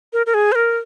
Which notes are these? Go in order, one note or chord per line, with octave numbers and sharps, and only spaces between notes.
A#4
A#4
G#4
C5
A#4